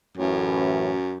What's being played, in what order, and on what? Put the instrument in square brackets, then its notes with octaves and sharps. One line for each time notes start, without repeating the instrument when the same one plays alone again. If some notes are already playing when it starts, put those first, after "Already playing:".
[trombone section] A1 A2 E3 [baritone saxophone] F#2